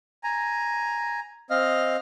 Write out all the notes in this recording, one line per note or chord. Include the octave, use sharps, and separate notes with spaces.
G#5 A#5
C4 D#5 F5 F6